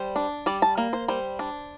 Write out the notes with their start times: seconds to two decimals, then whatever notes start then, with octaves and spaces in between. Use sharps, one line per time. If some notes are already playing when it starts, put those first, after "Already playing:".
Already playing: G3 C5
0.16 D4
0.46 G3 D5
0.62 A5
0.78 A#3
0.93 C5
1.08 G3 C5
1.39 D4